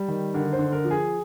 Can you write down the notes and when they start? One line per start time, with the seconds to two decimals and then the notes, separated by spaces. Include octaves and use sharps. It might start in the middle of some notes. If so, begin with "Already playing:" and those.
Already playing: G3
0.08 D#3
0.34 D3 A#4
0.53 C5
0.59 D3
0.72 A#4
0.84 F3
0.91 G#4